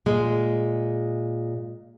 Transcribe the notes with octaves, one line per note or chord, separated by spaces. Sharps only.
A#2 G#3